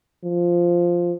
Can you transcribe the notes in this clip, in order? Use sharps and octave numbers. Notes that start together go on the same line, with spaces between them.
F3